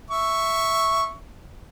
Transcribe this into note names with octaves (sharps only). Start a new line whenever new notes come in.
E5 C#6